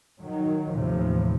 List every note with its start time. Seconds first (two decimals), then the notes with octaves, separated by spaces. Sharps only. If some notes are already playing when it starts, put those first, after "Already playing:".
0.20 D#3 F#3
0.73 D#2 A2 C3 E3 F3